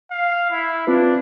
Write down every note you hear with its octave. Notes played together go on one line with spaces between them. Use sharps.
F5
E4
C4 D4 F4 B4